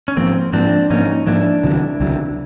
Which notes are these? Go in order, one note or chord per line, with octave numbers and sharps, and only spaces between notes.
C#4
G#2 F3 A#3 C4
G#2 F3 A#3 C4 D4
G#2 F3 A#3 C#4 D#4
G#2 F3 A#3 D4 E4
C#2 C3 D#3 F#3
C#2 C3 D#3 F#3